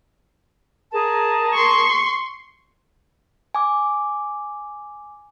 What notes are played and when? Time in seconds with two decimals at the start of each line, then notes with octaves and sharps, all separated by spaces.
0.92 G#4 A#4 A5
1.52 C6 C#6
3.55 G#5 D6